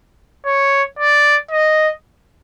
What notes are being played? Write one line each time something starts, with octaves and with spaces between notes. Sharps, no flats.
C#5
D5
D#5